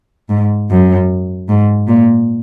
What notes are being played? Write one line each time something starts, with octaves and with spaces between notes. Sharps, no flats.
G#2
F#2
G#2
A#2